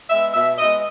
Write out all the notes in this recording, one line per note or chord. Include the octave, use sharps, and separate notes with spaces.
G#3 B3 E5
B2 E5
G#3 B3 D#5